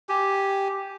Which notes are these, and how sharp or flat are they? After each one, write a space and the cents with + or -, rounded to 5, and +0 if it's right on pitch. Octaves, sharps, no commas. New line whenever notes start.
G4 +0 G#5 +0